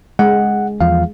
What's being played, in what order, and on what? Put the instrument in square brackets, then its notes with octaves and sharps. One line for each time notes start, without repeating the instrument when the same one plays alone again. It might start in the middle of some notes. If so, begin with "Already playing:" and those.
[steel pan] G#3 [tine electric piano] F#5
[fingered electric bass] E2 F3 [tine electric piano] F5